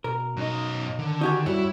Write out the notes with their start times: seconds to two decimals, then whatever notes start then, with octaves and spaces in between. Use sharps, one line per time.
0.04 B2 A#4
0.37 F#2 D#4 D#5
0.99 D3 D#3
1.21 D#4 F#4 G4 G#5
1.46 F#2 G3 E4 F#4 C#5